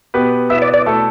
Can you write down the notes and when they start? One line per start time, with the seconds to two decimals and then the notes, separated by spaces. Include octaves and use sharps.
0.14 B2 B3 G4 B4
0.49 B2 B3 E4 B4 E5
0.62 D5
0.74 D5
0.86 B2 A3 E4 A4